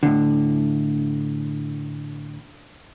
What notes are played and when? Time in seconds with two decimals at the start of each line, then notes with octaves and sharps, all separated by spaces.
0.03 A2 D3